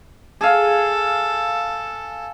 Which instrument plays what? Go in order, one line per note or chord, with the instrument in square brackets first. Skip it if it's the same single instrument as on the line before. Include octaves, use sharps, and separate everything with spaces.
[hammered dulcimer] G#4 F5 [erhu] A4